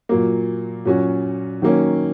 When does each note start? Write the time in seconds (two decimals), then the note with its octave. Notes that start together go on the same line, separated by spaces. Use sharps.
0.09 A#2 F#3 A#3
0.85 A#2 F#3 C#4 F#4
1.62 D#3 F#3 A#3 C#4